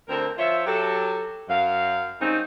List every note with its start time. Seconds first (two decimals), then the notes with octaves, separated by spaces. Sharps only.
0.08 D2 C4 A#4
0.38 F3 F4 C#5 E5
0.66 F#3 G4 A4
1.49 F#2 F5
2.21 D#3 G3 G#3 C4 C#4 D#4